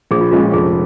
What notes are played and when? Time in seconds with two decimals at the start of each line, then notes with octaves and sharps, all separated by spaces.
0.11 A#1 G#4
0.21 F4
0.32 A#2 G#3 C#4 F4
0.43 F4
0.53 F1 G#4